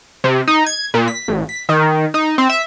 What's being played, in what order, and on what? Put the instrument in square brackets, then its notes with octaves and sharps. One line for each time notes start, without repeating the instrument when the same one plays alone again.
[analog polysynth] C3
D#4
G#6
A#2
B6
A1
B6
D#3
D#4
C4
E5